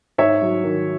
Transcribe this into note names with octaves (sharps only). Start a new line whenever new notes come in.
G#2 C#5 E5
F#3
D#3